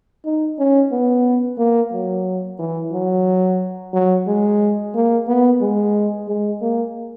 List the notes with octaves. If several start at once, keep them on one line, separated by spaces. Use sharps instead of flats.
D#4
C#4
B3
A#3
F#3
E3
F#3
F#3
G#3
A#3
B3
G#3
G#3
A#3